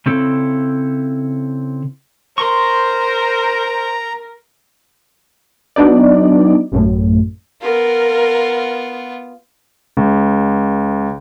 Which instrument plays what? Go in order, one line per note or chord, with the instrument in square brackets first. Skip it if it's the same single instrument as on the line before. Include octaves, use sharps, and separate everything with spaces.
[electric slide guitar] C#3 C4 E4 A4
[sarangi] A#4 [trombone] C5 [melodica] A#5 [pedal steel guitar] C6 C#6
[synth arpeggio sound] F#3 B3 D4 D#4 D5
A1 F#2 A2
[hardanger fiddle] B3 F4 [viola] A#4
[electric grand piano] C#2